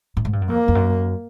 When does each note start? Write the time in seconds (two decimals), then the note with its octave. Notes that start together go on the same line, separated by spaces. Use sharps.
0.17 A2
0.25 G#2
0.33 G2
0.41 F#2
0.49 F2 A#3
0.68 F2
0.75 F#2